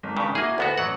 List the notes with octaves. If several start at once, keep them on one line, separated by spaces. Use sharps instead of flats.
G#1
G2 C#3
A#3 E4 F#4 G#4
D2 B3 F#4 B4 F#5 B5
A1 F#3 F#5